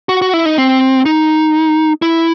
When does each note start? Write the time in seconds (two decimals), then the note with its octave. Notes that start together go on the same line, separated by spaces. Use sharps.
0.09 F#4
0.22 F#4
0.34 E4
0.46 D#4
0.58 C4
1.05 D#4
2.02 E4